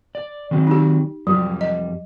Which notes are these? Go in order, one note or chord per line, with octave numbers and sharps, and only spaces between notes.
D5
D#3 F#3 C4
D#4 G4
F2 F#3 G3
D#5